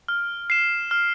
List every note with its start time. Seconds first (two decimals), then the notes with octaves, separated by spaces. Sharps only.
0.08 F6
0.50 C7 E7
0.91 F6